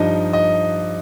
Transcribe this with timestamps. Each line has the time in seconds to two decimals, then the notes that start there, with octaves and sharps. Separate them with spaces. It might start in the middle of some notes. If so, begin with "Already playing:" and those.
Already playing: G2 F3 D#4 D#5
0.33 D#5